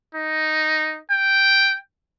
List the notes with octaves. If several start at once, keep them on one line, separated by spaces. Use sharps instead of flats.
D#4
G5